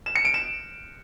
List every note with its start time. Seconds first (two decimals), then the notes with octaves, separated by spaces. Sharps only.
0.06 E7
0.15 C#7
0.25 D7
0.34 E7